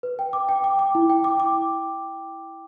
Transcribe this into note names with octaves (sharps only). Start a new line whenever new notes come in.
B4
G5
D6
G5
D6
D6
E4
G5
D6
D6